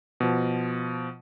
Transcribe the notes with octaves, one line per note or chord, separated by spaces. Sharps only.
B2 F3